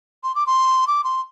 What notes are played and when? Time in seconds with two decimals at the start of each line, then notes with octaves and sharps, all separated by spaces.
0.24 C6
0.35 D6
0.47 C6
0.87 D6
1.04 C6